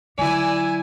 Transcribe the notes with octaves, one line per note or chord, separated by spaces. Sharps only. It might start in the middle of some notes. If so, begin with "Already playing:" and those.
D3 F#3 E4 D5 G#5